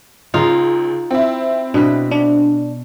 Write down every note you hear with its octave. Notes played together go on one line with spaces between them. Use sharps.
C#2 C#3 D#4 F4
C4 E4
B2 D4 B4
D4